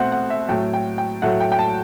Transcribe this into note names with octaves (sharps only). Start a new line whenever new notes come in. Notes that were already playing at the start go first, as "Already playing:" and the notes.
Already playing: B2 A3 C4 F#5
F#5
E5
A2 F#3 A3 G5
G5
G5
A2 F#3 A3 F#5
G5
G5
A5